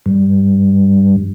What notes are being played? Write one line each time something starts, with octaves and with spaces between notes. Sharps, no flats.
G2